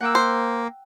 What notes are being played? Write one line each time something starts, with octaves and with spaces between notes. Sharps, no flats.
A#3 F#5 G5 E6
C5